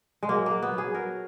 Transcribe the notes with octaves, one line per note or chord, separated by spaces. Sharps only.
G#3
F#3 A#3
F#3 A#3
B3
F#3 G#4
F#3 A#4